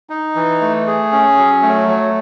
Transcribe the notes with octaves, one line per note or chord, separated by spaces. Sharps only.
D#4
E3
A3
G#4
C#4
F#3
A3
F#3